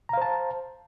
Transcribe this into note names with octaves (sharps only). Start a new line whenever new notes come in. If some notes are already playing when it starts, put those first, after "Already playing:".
C5 F5 A5 A#5